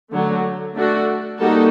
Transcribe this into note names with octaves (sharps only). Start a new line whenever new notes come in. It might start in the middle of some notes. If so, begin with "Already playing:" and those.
D3 F#3 A3
A3 D4 F#4 A4
G3 A#3 D#4 F#4 A4